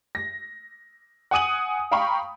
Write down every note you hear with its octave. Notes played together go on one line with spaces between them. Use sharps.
A#6
F#5 G#5 D#6 D#7 F#7
F5 G5 A#5 B5 C#6